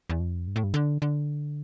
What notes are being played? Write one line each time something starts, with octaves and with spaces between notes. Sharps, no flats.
E2
F2
G2
A2
G2
D3
D3